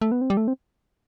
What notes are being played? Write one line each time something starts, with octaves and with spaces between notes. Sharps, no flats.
A3
B3
C4
G3
A3
C4